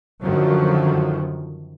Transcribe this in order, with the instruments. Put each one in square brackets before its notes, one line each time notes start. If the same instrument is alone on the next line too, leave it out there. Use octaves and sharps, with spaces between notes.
[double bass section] F#2 D3 D#3 F3 F#3